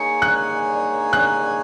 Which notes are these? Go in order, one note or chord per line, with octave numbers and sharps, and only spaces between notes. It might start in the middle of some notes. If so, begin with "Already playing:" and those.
Already playing: A#3 D#4 G#4 C#5 G#5 C#7
F#6
F#6